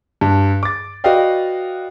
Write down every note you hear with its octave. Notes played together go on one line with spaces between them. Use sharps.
G2
D6 A6
F#4 B4 D5 D#5 F5 G5